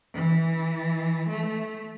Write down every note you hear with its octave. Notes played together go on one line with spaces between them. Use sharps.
E3
A3